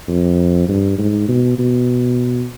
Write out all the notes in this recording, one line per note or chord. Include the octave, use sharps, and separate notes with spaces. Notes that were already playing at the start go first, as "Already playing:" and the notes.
F2
G2
G#2
B2
B2